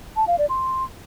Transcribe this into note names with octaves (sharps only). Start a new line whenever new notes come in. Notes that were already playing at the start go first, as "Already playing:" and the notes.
A5
F5
D5
C6